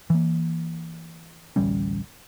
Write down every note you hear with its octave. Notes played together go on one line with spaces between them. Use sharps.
E3 A#3
A1 D2 G3 C#4